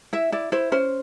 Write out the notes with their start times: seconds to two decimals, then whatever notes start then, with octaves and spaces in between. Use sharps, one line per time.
0.13 E4 E5
0.32 E4 D5
0.52 E4 C5
0.72 C#4 C5